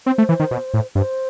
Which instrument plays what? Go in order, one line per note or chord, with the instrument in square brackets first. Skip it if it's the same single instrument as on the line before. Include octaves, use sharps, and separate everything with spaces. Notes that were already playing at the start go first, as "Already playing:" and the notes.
[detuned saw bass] C4 [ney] C5
[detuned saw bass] A3
E3
D#3
B2
A2
[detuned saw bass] G2 [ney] C5